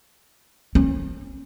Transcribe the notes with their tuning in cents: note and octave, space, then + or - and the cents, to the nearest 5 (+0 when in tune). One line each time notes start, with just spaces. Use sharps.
C#4 -45